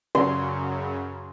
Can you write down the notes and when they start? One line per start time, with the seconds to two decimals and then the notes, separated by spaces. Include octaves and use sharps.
0.15 F#2 C#3 F#3 C6